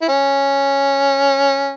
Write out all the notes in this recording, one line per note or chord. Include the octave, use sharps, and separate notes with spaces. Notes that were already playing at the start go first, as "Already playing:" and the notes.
E4
C#4